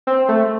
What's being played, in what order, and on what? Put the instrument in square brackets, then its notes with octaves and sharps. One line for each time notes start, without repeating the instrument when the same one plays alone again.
[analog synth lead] C4
A3